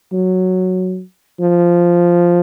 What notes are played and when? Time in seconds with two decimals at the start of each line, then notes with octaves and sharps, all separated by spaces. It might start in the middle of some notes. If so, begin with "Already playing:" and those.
0.13 F#3
1.40 F3